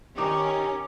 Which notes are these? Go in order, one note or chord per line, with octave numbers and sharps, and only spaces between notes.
D#3 C#4 D#4 G4 D6